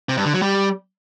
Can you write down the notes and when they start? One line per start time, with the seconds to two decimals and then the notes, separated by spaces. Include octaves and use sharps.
0.09 C3
0.17 G2
0.25 D3
0.34 F#3
0.42 G3